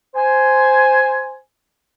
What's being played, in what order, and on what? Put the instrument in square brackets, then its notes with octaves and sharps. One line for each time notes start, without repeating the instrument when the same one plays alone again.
[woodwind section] C5 G#5